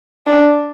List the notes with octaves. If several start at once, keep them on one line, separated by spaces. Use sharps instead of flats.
D4